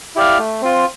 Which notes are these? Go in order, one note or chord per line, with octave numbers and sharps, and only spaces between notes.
E4 G4 D5 F5
A3
C4 F4